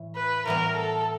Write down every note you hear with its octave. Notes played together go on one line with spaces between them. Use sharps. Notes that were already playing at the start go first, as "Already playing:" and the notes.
Already playing: A2 E3
B4
A2 E3 G3 B3 A#4
A4